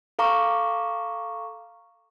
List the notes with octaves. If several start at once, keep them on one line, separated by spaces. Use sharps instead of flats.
A4 F5 A#5 C#6 D6